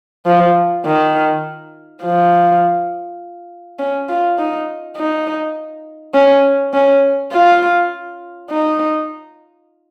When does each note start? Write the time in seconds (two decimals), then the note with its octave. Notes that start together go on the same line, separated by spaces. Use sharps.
0.26 F3
0.85 D#3
2.03 F3
3.79 C#4
4.09 F4
4.38 D#4
4.97 D#4
6.14 C#4
6.74 C#4
7.32 F4
8.50 D#4